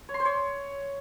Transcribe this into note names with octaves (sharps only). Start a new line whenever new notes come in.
C#5
C6
C5
C#5